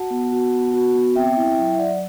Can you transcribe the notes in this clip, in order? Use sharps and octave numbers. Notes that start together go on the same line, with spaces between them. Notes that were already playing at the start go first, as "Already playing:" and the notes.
Already playing: F#4 F#5 A5
B3
F#4
B3
F#4
B3
C4 E5 G5
E4
F#3
E5
F#3 D5 F#5